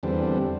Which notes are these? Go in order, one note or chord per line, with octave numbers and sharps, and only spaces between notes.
E2 D3 G3 C4